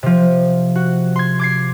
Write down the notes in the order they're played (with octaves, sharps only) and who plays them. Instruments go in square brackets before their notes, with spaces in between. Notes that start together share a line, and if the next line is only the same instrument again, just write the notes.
[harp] C3 F3
F#4
C6 G#6
D6 G#6 C7